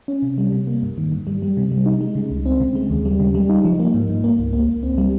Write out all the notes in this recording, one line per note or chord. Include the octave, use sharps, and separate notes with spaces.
C#4
C3
G3
C3
A#3
G2
D#3
G2
G3
G3
C3
G3
D#4
G#3
C#3
C#2
C4
C#3
G#3
D#2
G3
C#3
G3
D#4
F3
A#3
G#2
G#2
A#3
C#2
A#3
C#2
C4
G3